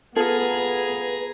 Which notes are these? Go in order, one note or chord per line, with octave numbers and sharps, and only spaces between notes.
B3 F4 G#4 A4 B4 A#5